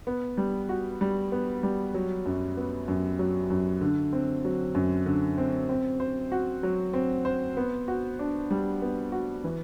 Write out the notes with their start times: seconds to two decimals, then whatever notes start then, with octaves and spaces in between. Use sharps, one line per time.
0.07 B3
0.38 G3
0.69 F#4
1.01 G3
1.32 B3
1.63 G3
1.94 F#3
2.26 F#2
2.57 B3
2.88 F#2
3.19 F#3
3.50 F#2
3.81 D3
4.13 C4
4.45 F#3
4.75 F#2
5.06 D3
5.38 C4
5.69 C4
6.00 C5
6.32 F#4
6.63 F#3
6.93 C4
7.25 C5
7.57 B3
7.88 F#4
8.19 D4
8.51 G3
8.82 B3
9.12 F#4
9.44 E3